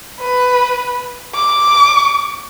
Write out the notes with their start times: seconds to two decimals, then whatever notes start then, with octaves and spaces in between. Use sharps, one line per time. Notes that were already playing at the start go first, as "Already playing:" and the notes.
0.20 B4
1.35 D6